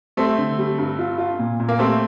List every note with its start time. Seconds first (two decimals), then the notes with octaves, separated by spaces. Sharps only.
0.17 G3 A3 C4
0.38 D3
0.59 G3
0.78 G2
0.99 F4
1.18 F4
1.39 A#2
1.60 A#2
1.69 A#3
1.79 A3 C4 G4